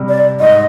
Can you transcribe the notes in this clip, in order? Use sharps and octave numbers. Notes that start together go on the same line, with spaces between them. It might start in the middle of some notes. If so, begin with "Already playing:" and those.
Already playing: C3 G3
D5
G#2 D#5